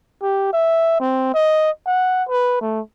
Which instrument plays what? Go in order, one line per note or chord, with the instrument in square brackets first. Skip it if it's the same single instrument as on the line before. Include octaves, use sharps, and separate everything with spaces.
[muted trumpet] G4
E5
C4
D#5
F#5
B4
A3